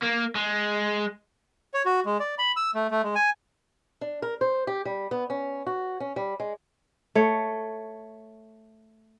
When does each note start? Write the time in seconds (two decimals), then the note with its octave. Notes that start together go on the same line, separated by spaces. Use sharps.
0.03 A#3
0.35 G#3
1.74 C#5
1.86 F#4
2.06 G#3
2.20 D5
2.38 B5
2.56 E6
2.75 A3
2.91 A3
3.03 G#3
3.15 G#5
4.01 D4
4.22 A#4
4.41 C5
4.67 G4
4.85 G3
5.11 B3
5.30 C#4
5.67 F#4
6.00 C#4
6.16 G3
6.40 G#3
7.15 A3 C#5